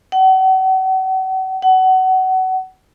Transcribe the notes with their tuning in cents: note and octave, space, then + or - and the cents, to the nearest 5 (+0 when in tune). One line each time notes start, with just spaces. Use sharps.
F#5 +40
F#5 +25